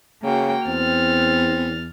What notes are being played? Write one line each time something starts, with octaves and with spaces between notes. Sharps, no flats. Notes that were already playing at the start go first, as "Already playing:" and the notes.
C#3 A#3 F#4 G5
E2 C4 F6 A6